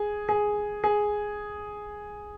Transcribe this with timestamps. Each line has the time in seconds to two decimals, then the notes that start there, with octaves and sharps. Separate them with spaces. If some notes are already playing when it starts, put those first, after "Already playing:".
Already playing: G#4
0.29 G#4
0.84 G#4